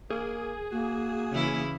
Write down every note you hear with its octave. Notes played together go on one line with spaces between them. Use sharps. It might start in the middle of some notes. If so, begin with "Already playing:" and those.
A#3 G#4
A#3 F#4
C#3 E3 E4